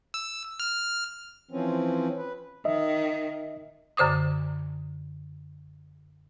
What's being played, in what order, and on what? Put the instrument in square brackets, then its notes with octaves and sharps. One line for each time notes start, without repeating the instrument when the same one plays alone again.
[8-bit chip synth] E6
F6
[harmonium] E3 F3 C4 C#4
B4
[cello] D#3 [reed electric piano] D#5 E5
[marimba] F#2 D3 C5 D6 D#6